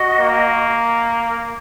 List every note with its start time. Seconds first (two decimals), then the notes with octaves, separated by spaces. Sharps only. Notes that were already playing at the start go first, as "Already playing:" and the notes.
Already playing: F#4 D#5 F#5
0.19 A#3